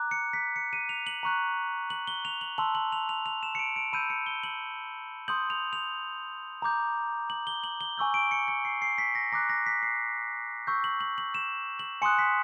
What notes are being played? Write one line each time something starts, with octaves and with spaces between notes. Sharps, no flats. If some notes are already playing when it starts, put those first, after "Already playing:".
Already playing: A#5 D6 F#6
C#7
B6
C#7
D#7
F7
F#7
A#5 C#6 F#6
F#7
G7
F7
F#7
A5 C6 E6 F#7
F#7
F7
F7
F7
E7
C#7
D7
D7
B5 E6 G6 D#7
C#7
G7
F#7
C6 D#6 G6 F#7
F7
F7
A#5 D6 G6
F#7
G7
F#7
G7
G#5 C#6 E6 G6
D7
C#7
C#7
C7
C7
B6
A#6
A#5 D6 F#6 A#6
A#6
B6
C7
C#6 E6 G6
F#7
F#7
F#7
E7
F#7
G#5 C6 D#6 F#6 C#7
B6